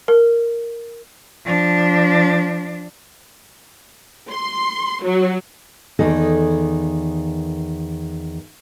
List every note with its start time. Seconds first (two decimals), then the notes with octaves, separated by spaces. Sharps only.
0.08 A#4
1.45 F3 D4
4.32 C6
5.05 F#3
5.99 E2 D#3 A4 D#5